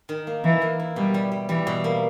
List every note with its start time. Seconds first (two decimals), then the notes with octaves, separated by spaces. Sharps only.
0.09 D#3
0.27 A#3
0.44 E3 E4
0.62 A#3
0.79 E4
0.96 B2 G3
1.14 G3
1.32 G3
1.49 E3 G3
1.67 B2
1.84 A#3